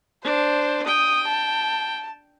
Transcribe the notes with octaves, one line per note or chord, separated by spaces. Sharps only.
D4 C5
G5 D#6
A5